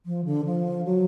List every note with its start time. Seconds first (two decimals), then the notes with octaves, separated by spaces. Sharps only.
0.06 F3
0.25 D3
0.45 F3
0.85 F#3